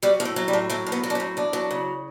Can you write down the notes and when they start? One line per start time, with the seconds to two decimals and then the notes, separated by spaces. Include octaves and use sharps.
0.03 F#3 G3
0.20 A2
0.25 A3
0.36 F#3
0.48 G3
0.53 A2
0.70 F#3 A3
0.87 A2
0.92 B3
1.04 F#3
1.10 D4
1.15 C#4
1.20 A2
1.37 E2 D4
1.53 F#3
1.71 C#3